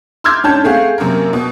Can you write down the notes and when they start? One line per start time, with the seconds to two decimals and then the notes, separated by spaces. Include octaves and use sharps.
0.24 C6 D6 E6 F6 G6 G#6
0.44 G#2 C#4 D4 A5 G6
0.64 A3 C4 G#4 F5 F#5
0.98 F#2 C3 A#3 A#4
1.33 B2